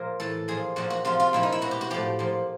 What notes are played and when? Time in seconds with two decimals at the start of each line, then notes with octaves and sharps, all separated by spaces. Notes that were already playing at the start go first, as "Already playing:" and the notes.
Already playing: A#2 F3 A#4
0.20 A2 E3 A4
0.48 A#2 F3 G#4
0.76 A#2 F3 F#4
0.90 F#4
1.05 C3 F3 F4
1.20 F4
1.33 A#2 F3 E4
1.43 D#4
1.52 E4
1.62 B2 F#4
1.71 G4
1.81 F#4
1.90 A2 F3 G4
2.19 A#2 F3